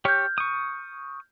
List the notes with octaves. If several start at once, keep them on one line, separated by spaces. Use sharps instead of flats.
G4 C#5 F6 G6
C#6 D#6